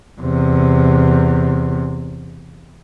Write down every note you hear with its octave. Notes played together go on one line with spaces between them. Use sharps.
E2 C3